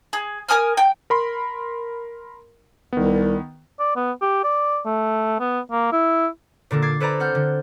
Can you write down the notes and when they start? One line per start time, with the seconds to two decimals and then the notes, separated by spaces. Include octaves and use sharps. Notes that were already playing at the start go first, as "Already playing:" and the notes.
0.13 G#4
0.49 A#4 G#5 D#6 F6
0.77 G5
1.10 A#4 B5 C6
2.93 C2 D#3 B3
3.79 D5
3.96 B3
4.21 G4
4.43 D5
4.85 A3
5.40 B3
5.71 A#3
5.92 E4
6.71 A#2 D3 A#3 A4
6.82 D6 G#6 A6 C7
7.00 A4 B4 C5 D5 A#5 B5
7.20 C4 F#5 F6 G6
7.35 D3